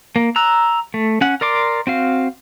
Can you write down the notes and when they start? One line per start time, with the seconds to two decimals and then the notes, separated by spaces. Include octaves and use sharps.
0.16 A#3
0.36 A#5 E6 F#6
0.94 A3
1.21 C#4 F#5
1.41 A#4 D5 C6 D6
1.87 C4 F#4 F5